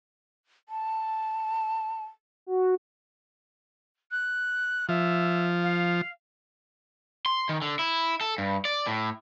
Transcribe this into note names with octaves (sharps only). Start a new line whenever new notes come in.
A5
F#4
F#6
F3 E5
F5
C6
D#3
D3
E4
A4
G2
D5
A2